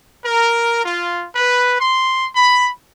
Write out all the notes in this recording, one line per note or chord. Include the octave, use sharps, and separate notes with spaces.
A#4
F4
B4
C6
B5